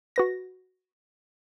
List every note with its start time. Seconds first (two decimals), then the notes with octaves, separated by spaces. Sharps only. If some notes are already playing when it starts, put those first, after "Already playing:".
0.16 F#4 B4 A#6